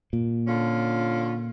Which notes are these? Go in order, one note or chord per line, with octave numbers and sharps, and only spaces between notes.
A#2
D3 C#4 F4